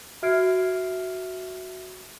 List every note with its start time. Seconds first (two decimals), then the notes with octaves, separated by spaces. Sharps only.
0.22 F#4 E5 F6 G#6 C7 D7